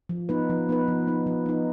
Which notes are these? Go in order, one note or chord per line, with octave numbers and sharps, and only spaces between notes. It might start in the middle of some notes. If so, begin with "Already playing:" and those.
F3
B3 D#4 B4
F3
B3 D#4 B4
F3
B3 D#4
F3
B3 D#4